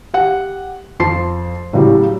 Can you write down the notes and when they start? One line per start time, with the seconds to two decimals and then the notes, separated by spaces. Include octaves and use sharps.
0.14 G4 F#5
1.00 F2 F3 A5 C6 C7
1.73 A2 C#3 F#3 G3